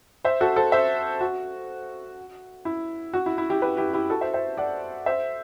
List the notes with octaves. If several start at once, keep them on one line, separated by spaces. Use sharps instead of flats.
C5 E5
F#4 A4
A4 C5
C5 E5
F#4
E4
F#4
E4
E4
E4 G4
G4 B4
E4 G4
E4 G4
F#4 A4
C5 E5
C5 E5
D5 F#5
C5 E5